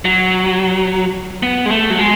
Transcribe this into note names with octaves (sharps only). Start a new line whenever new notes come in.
F#3
B3
G#3
A3
F#3
G#3